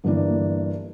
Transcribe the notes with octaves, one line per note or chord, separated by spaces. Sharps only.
G1 G2 E3 A#3 D4